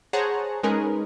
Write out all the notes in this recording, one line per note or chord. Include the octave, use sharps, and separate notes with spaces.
G#4 C5 C#5 F#5 A5 A#5
G#3 C#4 D#4 G#4 A#4 B4